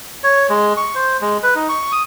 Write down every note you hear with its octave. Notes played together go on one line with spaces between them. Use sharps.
C#5
G#3
C#6
C5
G#3
B4
D#4
C#6
D#6